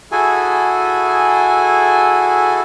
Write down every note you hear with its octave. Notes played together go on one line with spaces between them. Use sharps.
E4 F#4 G#4 A4 G#5